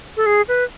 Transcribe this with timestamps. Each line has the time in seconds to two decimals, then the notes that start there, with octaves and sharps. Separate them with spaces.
0.17 A4
0.26 G#4
0.48 B4